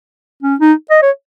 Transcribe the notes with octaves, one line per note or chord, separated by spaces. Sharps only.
C#4
D#4
D#5
C#5